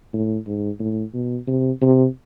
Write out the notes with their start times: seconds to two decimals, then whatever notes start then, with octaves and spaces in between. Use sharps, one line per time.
0.13 A2
0.46 G#2
0.79 A2
1.14 B2
1.47 C3
1.82 C3